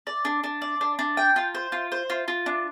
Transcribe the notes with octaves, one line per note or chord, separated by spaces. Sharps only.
D5
D4
D4
D5
D4
D4
G5
F4
C5
F4
C5
F4
F4
D4